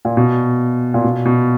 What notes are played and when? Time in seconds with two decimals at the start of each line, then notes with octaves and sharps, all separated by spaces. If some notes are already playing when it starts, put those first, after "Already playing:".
0.05 A#2
0.17 B2
0.94 A#2
1.04 B2
1.25 B2